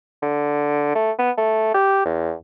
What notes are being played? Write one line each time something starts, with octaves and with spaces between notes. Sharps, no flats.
D3
A3
B3
A3
G4
E2